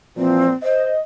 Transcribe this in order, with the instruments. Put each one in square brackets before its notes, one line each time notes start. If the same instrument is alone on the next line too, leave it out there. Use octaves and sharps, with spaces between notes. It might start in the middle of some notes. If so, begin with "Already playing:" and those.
[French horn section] A#2 E3 F3 [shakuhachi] C4
[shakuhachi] C5 [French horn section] D#5